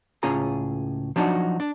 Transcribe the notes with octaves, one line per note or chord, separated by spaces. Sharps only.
C#2 A2 C#4 F4 G#4 A#5
F3 F#3 D4 D#4 F#4
D4